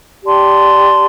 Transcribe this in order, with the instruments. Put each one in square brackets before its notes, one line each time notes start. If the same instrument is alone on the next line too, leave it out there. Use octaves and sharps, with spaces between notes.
[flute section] G4 D5 A5 C6